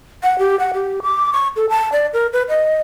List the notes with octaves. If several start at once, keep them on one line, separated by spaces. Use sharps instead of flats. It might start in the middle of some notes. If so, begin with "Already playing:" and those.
F#5
G4
F#5
G4
D6
C#6
A4
A5
D5
A#4
B4
D#5